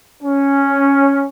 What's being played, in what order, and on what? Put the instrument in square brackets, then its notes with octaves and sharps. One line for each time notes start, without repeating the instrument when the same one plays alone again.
[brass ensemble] C#4